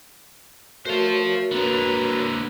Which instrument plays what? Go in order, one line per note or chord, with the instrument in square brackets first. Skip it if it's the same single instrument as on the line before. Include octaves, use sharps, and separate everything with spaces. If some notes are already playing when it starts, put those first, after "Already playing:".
[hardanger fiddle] A3 [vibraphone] F#4 A#4 C#5 [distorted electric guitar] C5 F5
[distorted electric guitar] D3 A#3 [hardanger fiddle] B4 A#5